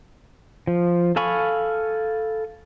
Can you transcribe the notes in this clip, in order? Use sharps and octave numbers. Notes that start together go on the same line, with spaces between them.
F3
A4 F5 G#5 B5 C#6